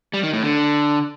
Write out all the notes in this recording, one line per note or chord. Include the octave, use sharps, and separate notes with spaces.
G3
D#3
A2
D3